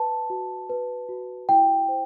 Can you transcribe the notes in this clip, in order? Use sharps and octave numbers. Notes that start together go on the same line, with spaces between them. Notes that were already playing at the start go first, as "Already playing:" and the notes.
Already playing: B4 A5
F#4
B4
F#4
E4 G5
C5